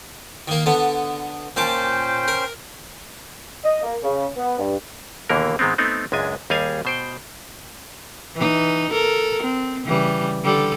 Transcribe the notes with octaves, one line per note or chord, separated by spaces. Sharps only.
D#3 A#3
D3 B3
A#2 C#4 C5 G5 A5 D6
A#4
D#5
A#3
C#3
B3
G2
D#2 B2 D3 E3 A#3 A#4
G#2 D#3 G#3 B3 C4
A3 B3 C4 D#4
C#2 F#2 G#3 D4 G#5
D#2 G3 G#4 F5 G#5
B2 C5 G5
E3 D#4
A4 A#4
C4
C#3 E3 G3
D3 G3 A4